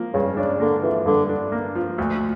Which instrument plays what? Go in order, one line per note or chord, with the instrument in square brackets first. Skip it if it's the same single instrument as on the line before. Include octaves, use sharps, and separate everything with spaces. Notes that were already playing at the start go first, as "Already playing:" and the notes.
Already playing: [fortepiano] F3 A#3
[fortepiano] G2 [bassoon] C#3
[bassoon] C#3 [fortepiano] D4
[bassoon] D3 [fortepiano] A#3
[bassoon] E3 [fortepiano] F3
[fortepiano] G2 [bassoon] D3
[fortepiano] D4
A#3
F3
D2